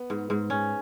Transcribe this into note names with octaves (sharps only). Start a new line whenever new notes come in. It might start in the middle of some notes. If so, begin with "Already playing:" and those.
Already playing: B3
G#2
G#2
C#4